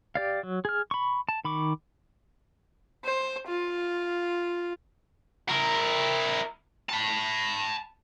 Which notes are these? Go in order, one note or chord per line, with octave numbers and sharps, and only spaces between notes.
G4 D5 F5
F#3
G#4 F6
B5 C#6
A5
D#3 B5 C#6 D6
C5
F4
E4 A#4
A5 B5